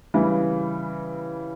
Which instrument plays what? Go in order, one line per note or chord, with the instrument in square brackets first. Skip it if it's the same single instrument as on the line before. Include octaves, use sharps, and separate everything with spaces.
[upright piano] C#3 E3 G3